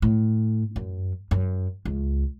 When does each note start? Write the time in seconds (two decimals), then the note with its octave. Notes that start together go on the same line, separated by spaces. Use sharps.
0.02 A2
0.76 F#2
1.31 F#2
1.85 C#2